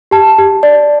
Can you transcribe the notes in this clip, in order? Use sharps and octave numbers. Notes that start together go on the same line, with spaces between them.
G4 A5
G4
D5